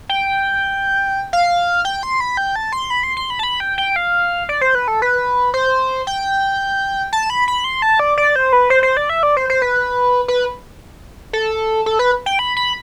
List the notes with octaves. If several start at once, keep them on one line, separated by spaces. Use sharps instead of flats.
G5
F5
G5
C6
B5
G5
A5
C6
B5
C6
C6
B5
A5
B5
G5
G5
F5
D5
C5
B4
A4
B4
C5
G5
A5
B5
B5
C6
A5
D5
D5
C5
B4
C5
C5
D5
E5
D5
C5
C5
B4
B4
A4
A4
B4
G5
B5
B5